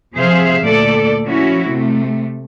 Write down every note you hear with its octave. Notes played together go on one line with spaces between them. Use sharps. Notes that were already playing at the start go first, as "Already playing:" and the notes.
C3 F3 G#4 C5 E5 F5
D2 A#2 A4 D5
F3 C#4 E4 F#4
C3 A3